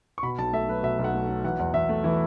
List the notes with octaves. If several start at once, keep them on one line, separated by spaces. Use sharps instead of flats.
C#6
B2 B5
B1 A5
A3 E5
F#3 B4
B2 E5
B1
F#5
A3
F#3
E3 F#5
E2
E2 E5
A3
E3 E4